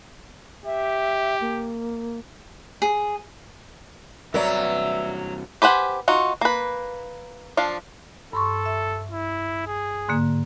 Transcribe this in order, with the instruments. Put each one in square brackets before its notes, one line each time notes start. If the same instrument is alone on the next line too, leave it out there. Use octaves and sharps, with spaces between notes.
[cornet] G4 [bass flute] E5
[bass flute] A#3
[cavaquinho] G#4
[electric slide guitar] G2 C3 A#5 [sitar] F#3 [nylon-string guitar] B4 D5 [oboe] E5
[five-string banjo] G4 B4 C5 F#5 G#5
D#4 F4 F#4
A#3 B4
F3 D4 F5
[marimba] G2 C6 C#6 [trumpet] A4
[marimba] E5
[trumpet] E4
G#4
[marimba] G#2 D3 A#3